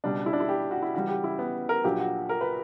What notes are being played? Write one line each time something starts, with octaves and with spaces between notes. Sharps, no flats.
C#2 B2 G3 D4
E4
D4
E4
G4
F#4
E4
C#2 C#3 E3 G3 F#4
G4
E4
B3
A#4
A#1 A#2 F#3 G4
F#4
A#4
B4